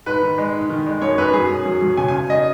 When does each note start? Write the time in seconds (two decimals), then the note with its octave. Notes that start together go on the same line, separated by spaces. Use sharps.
0.06 G#2 B4
0.23 D#3
0.38 G#3
0.54 G#2
0.69 D#3
0.87 G#3
1.01 F#2 C#5
1.18 F#2 B4
1.33 F#3 G#4
1.51 F#2
1.65 F#3
1.82 F#3
1.97 C#3 G#5
2.08 G#5
2.14 C#3
2.30 C#3 D#5